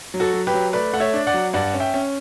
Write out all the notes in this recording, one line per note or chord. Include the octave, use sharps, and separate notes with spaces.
F#3
F#4 A4
F#3
G4 B4
F#3
A3 B4 D5
A3 F#5
C#5 E5
D4
D5 F#5
F#3
G2 D5 F#5
C#4
E5 G5
C#4